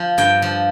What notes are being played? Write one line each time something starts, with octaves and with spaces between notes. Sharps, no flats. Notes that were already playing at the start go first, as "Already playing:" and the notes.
Already playing: F3
G2 G5
F3